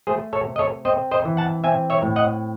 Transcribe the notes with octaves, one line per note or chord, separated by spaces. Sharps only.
A3 G#4 C5
A4 C#5
C3
D#5
A4 C#5
C4 C5 D#5
C5 D#5
E3
F#5 A5
C4 E5 G#5
C#5 E5
A2
D#5 F#5